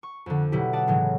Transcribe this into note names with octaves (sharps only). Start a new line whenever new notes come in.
C#6
F2 D3
B2 F#3 E4 G4
D5 F#5 A5 D#6
A2 C#3 E3 F#3 G#3